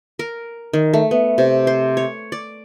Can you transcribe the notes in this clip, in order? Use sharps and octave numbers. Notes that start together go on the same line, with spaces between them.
A#4
D#3
A3
B3
C3
C5
C#5
D5